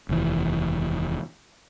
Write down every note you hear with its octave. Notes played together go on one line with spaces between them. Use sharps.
F1 D#2 A#2 E3